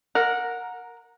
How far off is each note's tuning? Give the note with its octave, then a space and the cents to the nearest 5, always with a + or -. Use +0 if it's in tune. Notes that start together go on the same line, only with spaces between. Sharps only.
A#4 +0 F#5 -20